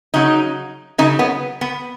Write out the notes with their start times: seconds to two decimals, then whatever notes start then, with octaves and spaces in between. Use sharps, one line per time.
0.14 C#3 F#3 D#4
0.98 C#3 F#3 D#4
1.19 B3
1.61 B3